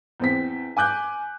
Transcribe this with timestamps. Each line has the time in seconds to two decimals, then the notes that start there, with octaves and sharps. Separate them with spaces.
0.20 E2 C4 B6
0.77 G#5 D6 F#6 G6